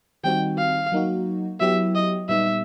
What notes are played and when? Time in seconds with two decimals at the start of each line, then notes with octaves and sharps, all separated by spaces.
0.24 D#3 G3 C4 D#4 F#4 G5
0.58 F5
0.92 F#3 A#3 D#4 F#4
1.60 F#3 B3 E4 G4 E5
1.95 D#5
2.29 A#2 G3 B3 D#4 E5